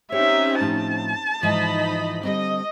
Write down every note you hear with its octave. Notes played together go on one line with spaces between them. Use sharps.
C4 C#4 D#4 G4 C#5 E5
A2 F3 A5
G#2 E3 F3 D#4 D#5 B5
D3 G3 C4 D#5